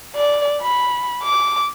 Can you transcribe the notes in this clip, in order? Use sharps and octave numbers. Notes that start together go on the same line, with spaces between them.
D5
B5
D6